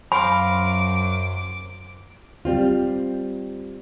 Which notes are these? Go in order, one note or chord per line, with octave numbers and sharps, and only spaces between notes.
F#2 C5 F5 A#5 B5 D6
G3 C4 F4